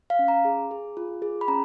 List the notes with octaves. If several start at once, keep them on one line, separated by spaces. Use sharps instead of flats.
F5
C#4
A#5
G#4
G#4
F4
G#4
B5
C#4 A#5